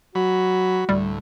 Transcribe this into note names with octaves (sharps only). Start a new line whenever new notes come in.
F#3 F#4 B5
D2 A2 G3